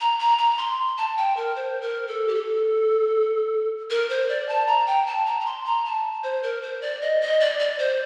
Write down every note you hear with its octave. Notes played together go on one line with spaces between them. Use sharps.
A#5
A#5
A#5
C6
A5
G5
A#4
C5
A#4
A4
G4
A4
A#4
C5
D5
A5
A#5
G5
A5
A#5
A#5
C6
A#5
A5
C5
A#4
C5
D5
D#5
D#5
D5
D5
C5